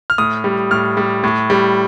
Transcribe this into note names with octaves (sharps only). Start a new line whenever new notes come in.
F6
A2 D#6
G3
A2 F6
G3
A2
G3